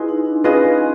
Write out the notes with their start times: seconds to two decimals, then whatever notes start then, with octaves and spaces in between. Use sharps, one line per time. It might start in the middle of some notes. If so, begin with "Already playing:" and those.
Already playing: E4 F4 G#4 B4 D#5
0.08 D#4
0.26 D4
0.44 C#4 F4 G#4 B4 D#5